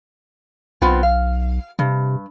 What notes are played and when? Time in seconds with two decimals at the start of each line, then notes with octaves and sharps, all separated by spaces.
0.82 B1 B3 C4 F4
1.03 F5
1.79 G2 C3